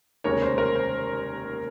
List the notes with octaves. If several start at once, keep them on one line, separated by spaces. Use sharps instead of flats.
F1 D#2 C#3 G#3 A#4 C#5
C5
A#4
C5